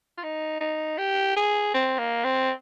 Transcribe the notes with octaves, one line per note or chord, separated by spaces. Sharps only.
F4
D#4
D#4
G4
G#4
C4
A#3
C4